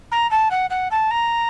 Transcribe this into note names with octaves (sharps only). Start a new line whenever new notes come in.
A#5
A5
F#5
F#5
A5
A#5